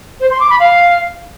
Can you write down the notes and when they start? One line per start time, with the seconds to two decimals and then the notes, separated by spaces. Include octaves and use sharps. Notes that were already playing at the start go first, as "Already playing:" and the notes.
0.20 C5
0.30 C6
0.40 D6
0.50 B5
0.60 F5